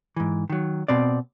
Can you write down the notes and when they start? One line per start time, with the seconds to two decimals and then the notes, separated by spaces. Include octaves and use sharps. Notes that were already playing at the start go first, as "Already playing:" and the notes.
0.16 G#2 E3
0.50 D#3 F#3
0.88 B2 C4 D5